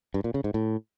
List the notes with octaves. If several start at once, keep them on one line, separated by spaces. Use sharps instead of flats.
G2
A#2
C#3
G#2
A2